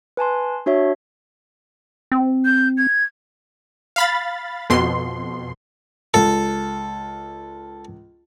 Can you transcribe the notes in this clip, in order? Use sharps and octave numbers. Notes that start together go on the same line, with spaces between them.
B4 G#5 A5 C6
D4 F#4 C#5 E5
C4
G6
G#6
F5 B5 A6
F2 B2 C6
C#2 A4